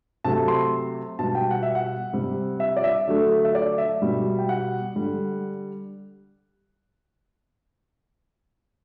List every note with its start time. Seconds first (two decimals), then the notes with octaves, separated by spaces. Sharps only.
0.24 C3 F#3 A3 A5
0.48 C6
1.19 B2 G3 A5
1.35 G5
1.51 F#5
1.63 E5
1.75 F#5
2.13 C3 G3
2.60 E5
2.77 D5
2.84 E5
3.07 D3 F#3 A3
3.45 E5
3.55 D5
3.78 E5
4.02 B2 G3
4.39 G5
4.49 F#5
4.96 D3 G3